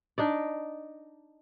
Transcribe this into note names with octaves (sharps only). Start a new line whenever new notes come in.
D4 D#4 D5